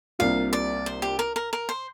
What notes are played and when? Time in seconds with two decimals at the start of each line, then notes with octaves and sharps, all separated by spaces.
0.19 C2 C3 A#3 D4 F4 F5
0.53 D5
0.86 C5
1.02 G4
1.19 A#4
1.36 A#4
1.53 A#4
1.69 C5